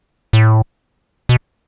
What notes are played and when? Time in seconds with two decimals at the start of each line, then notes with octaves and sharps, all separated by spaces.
0.33 A2
1.29 B2